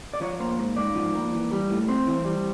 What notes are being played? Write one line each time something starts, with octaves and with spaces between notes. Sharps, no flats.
D5
F3 C#5
A#3 C5
G#2
G#2 D5
F3
A#3
E3
G3
A2
C4 C5
E3
G3